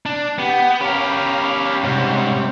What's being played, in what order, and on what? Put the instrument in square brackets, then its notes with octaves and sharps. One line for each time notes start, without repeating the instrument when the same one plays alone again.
[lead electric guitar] D4
[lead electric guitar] B3 [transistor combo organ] G4
[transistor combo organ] C#4 F5 B5 [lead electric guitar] G4 A#4
[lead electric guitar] G#2 [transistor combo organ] C3 G3 C#4